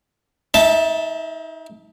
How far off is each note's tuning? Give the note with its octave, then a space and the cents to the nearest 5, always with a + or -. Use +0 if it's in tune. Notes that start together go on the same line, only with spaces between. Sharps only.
D#4 +35 E5 +0 A5 +0